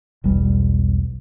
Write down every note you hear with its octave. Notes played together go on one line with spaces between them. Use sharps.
E1 B1 G3